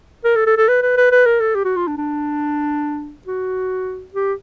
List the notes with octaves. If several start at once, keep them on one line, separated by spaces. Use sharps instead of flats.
A#4
A4
A4
A4
B4
B4
B4
B4
A#4
A4
G4
F#4
F4
D4
D4
F#4
G4